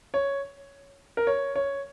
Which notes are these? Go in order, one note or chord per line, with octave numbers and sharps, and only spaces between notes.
C#5
A#4
C#5
C#5